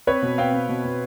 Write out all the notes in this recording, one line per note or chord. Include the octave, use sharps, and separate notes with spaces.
C4 B4 C#5
B2
C4 F5 G5
C4
B2
B2